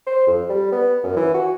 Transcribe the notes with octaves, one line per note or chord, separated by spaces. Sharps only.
C5
F2
G3
B3
F#2
E3
F#4